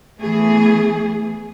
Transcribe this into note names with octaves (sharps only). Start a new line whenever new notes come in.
E3 A3 B3 G#4